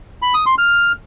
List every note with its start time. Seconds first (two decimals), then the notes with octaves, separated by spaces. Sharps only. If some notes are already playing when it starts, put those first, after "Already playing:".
0.22 B5
0.34 D#6
0.46 C6
0.58 F6